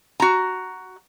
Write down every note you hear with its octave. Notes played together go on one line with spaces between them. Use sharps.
F#4 A#5